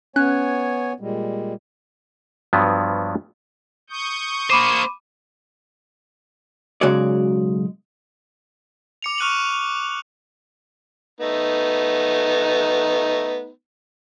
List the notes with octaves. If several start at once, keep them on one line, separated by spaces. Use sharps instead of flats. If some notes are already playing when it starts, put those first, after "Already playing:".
B3 C#4 C#5 G#5 F#6
A#2 G3 G#3
G2 F3 F#3 B3
C#6 D#6 G6
A#3 C5 B5 D6 D#7
B1 C#3 G#3 F#4 C#5 D5
D6 C#7 F7
C#6 F6 F#6 D#7 F7 F#7
A3 B3 D#4